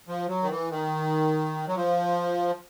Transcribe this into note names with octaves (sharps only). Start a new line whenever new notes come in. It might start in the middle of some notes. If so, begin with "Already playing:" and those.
F3
F#3
D#3
E3
D#3
F#3
F3